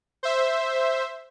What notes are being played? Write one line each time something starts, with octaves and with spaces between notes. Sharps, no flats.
C5 E5